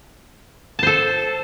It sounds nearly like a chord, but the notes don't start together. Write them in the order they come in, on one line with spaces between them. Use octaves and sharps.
A5 C5 A4